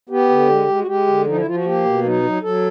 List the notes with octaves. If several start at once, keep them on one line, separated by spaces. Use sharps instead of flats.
B3 G4
D3
G#3
G#3
F#4
G#3 G4
D3
F3 D#4
E4
F3 F4
F#4
A#3 G4
B2
F#3 D#4
F#3
F#3 A4